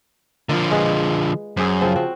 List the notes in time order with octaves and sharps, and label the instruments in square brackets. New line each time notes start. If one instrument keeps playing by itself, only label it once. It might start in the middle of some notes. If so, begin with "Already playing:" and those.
[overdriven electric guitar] D3 F3 [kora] A#3 F4
[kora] G#3 G#4 B4
[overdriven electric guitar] F#2 [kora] G#4 C5
[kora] C#3 F3 C4
C4 F#4